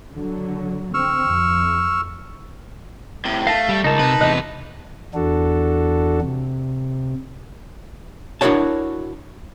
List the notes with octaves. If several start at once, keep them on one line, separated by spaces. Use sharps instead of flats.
D3 F#3
C4 C#6 E6 F6
F2
A2 C3
A3 F5 A5 A#6
G3
C#2 D#4 A#4 D#5 A5
C3 B4
E2 C3 D#5 F#6
E2 D4 F#4 A4
C3
D4 E4 F#4 A#4 C#5 A5